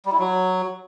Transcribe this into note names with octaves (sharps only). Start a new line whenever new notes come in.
G3
E4
F#3